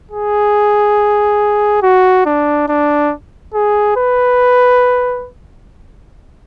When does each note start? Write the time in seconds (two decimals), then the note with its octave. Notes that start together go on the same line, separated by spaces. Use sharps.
0.11 G#4
1.83 F#4
2.26 D4
2.68 D4
3.54 G#4
3.97 B4